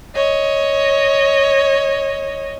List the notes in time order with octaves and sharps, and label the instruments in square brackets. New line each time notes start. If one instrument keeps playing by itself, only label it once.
[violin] C#5 D#5